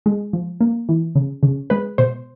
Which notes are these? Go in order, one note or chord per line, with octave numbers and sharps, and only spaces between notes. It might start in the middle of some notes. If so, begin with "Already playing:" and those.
G#3
F3
A#3
E3
C#3
C#3
G#3 B4
B2 C5